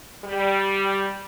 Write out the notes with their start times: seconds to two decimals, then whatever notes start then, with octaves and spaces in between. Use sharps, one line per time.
0.24 G3